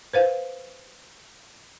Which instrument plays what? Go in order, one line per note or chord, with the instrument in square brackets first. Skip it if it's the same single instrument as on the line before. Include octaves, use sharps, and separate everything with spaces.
[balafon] B4 C5 F5